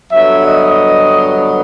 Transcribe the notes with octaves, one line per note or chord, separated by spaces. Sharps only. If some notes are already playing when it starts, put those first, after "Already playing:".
G2 D3 F#3 B3 E5
D#5